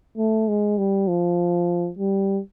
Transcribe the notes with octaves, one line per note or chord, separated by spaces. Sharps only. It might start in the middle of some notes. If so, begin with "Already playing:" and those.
A3
G#3
G3
F3
G3